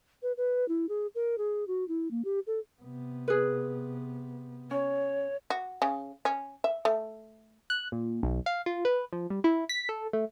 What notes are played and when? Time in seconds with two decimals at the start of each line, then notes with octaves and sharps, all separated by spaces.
0.23 B4
0.37 B4
0.68 E4
0.89 G#4
1.15 A#4
1.38 G#4
1.68 F#4
1.88 E4
2.11 A#3
2.25 G4
2.47 A4
2.82 C3 B3
3.28 G#4 B4
4.71 C#4 C#5
5.50 F#4
5.82 C#3
6.25 C#4
6.64 E5
6.85 A3
7.70 F#6
7.92 A#2
8.23 B1
8.46 F5
8.66 F4
8.85 B4
9.13 F3
9.30 G3
9.44 E4
9.69 B6
9.89 A4
10.13 A3